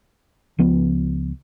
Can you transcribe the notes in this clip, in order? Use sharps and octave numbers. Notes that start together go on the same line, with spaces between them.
C#2 F3 B3